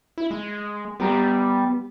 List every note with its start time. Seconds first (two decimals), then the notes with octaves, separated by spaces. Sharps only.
0.18 E4
0.31 G#3
1.00 G3 B3 G4 A#5